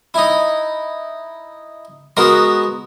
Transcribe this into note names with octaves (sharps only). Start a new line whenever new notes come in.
D#4 E4
G#3 B3 F#4 A#4